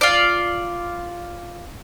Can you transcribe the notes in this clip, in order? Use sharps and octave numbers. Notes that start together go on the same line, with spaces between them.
F4 D5